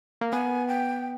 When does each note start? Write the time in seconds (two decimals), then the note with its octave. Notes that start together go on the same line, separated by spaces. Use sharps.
0.21 A#3
0.32 B3 G#5
0.68 G5